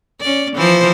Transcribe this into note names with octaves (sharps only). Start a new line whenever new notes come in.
C#4 D5
E3 F3 C5